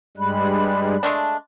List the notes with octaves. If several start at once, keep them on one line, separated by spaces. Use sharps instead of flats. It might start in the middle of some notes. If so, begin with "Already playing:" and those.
G2 G3 G#3 B5 F#6
G#3 A3 D4